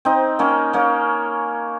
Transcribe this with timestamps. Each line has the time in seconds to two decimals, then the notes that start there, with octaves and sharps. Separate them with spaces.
0.05 C4 D#4
0.39 A#3 C#4
0.73 A#3 C#4